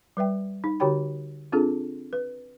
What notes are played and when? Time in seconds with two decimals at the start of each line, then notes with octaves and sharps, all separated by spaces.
0.17 G3 B4 E5 G5
0.64 D#4
0.80 D3 F#4 G4 C#5 G5 B5
1.52 C4 D4 F4 G#4 A4
2.13 B4